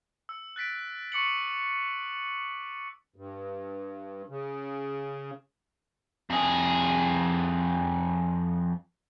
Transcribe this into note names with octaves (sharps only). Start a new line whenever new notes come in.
E6
F#6 A6 B6 D7
C#6 D6 C#7 F#7
G2
C#3
F2 G#4